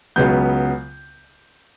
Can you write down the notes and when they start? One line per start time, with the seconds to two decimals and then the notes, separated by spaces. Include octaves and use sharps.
0.16 C#2 C#3 F#3 B3 G6